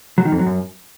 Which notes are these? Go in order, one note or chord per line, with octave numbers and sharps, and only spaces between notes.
F#3
D#3
F2
F#3
F#2